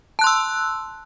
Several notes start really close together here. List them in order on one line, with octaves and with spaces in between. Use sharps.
A5 F#6 C6 E6